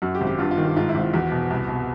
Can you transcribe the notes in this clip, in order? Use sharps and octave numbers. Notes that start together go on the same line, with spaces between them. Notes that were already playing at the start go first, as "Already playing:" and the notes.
F#2 F#4
G4
G#1
G4
G2 F4
F4
D#3
G4
G#2 F4
E4
G#1
F4
E2 F#4
B2
C2
B2